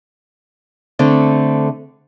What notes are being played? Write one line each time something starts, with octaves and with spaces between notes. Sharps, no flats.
D3 A3 C4